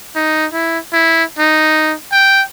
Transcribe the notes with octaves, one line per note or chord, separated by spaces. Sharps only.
D#4
E4
E4
D#4
G5